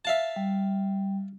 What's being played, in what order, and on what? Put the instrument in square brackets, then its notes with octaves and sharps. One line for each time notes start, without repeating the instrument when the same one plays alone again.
[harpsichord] E5 F5 A5
[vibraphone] G3